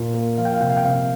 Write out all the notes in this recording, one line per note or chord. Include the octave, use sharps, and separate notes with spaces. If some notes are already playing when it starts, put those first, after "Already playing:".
Already playing: A#2 A#3
A#3
F3 F5
G5
F5
C3 G5
F5
G5
C3 F5